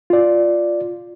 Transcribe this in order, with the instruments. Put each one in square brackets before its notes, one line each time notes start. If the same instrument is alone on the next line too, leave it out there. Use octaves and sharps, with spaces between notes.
[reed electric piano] F4 D5